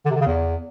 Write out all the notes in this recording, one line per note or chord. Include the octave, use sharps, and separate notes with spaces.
D3
C3
D3
C#3
E2